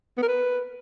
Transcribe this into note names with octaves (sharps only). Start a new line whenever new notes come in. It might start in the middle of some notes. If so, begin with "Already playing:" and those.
B3
A#4
B4